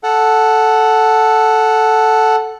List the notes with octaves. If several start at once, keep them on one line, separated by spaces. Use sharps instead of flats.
A4 F#5